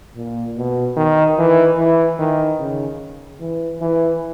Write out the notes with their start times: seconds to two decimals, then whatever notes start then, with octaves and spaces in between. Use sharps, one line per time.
0.16 A#2
0.57 B2
0.97 D#3
1.38 E3
1.78 E3
2.19 D#3
2.59 C#3
3.40 E3
3.81 E3